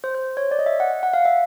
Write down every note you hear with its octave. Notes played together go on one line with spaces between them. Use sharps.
C5
C5
C#5
D5
D#5
E5
F#5
F#5
F5
E5